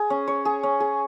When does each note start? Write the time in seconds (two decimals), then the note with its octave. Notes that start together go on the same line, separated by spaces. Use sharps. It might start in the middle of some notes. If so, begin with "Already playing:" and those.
Already playing: G#4
0.10 C#4
0.28 C#5
0.45 G#4
0.63 C#4
0.80 G#4